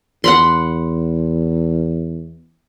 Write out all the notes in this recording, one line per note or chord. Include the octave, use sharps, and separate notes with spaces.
E2 F#5 B5 C6